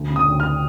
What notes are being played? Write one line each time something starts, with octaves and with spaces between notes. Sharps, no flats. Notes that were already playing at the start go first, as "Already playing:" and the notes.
Already playing: D2
C#3
D#6
D2
F6